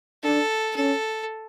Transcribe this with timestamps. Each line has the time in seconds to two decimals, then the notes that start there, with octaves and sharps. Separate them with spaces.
0.23 D4 A4
0.76 C#4 A4